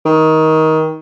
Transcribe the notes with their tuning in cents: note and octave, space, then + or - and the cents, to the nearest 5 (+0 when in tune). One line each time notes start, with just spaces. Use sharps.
D#3 +20